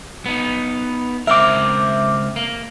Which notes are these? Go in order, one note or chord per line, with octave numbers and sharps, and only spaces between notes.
B3 D#4
C#2 C4 A#4 E5 D6
A#3